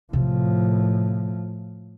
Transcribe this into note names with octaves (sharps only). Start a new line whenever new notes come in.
A2 C3 F3 C4